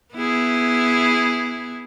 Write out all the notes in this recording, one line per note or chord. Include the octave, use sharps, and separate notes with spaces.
B3 E4 G#4